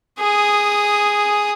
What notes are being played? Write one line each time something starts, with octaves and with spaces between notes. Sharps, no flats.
G#4 D#6